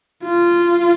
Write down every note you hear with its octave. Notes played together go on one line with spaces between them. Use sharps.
F4